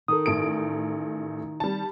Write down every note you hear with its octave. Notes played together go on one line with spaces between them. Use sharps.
D#3 A4 D#6
A1 D7
G3 A5